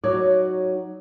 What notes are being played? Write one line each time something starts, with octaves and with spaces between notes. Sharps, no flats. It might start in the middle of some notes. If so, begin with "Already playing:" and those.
F#3 D#4 F#4 C#5 D5